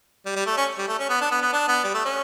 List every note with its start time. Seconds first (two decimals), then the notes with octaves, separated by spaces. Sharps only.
0.26 G3
0.36 G3
0.46 A3
0.57 C#4
0.78 G3
0.88 A3
0.99 C#4
1.10 B3
1.21 D4
1.31 B3
1.42 B3
1.53 D4
1.68 B3
1.84 G3
1.94 A3
2.05 C#4